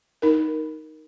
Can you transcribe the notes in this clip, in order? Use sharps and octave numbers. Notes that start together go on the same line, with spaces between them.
D#4 A#4